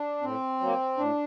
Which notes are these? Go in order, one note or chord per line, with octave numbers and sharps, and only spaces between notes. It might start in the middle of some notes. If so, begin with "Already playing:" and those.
Already playing: D4
A2 C4
F#3 A#3
A2 D4